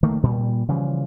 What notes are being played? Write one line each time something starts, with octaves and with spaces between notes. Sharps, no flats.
D#3 A3 A#3
A#2 G3
C#3 E3 F3 G3